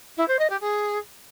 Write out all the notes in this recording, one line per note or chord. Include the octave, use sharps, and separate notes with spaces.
E4
C5
D#5
G4
G#4